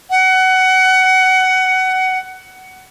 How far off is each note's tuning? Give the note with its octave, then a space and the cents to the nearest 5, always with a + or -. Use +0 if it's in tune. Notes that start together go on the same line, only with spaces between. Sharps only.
F#5 +20